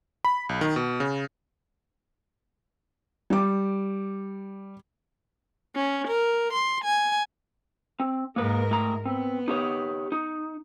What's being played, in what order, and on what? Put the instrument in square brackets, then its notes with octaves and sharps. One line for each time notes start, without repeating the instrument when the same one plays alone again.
[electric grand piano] B5
B1
D#3
B2
C#3
[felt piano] G3 D6
[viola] C#4
A#4
C6
G#5
[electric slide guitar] C4
[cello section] G#2 A#4 [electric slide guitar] A#3 B4
[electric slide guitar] A2 A#5
[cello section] B3 [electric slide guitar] C4
[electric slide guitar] D#4 G4 C#5
D#4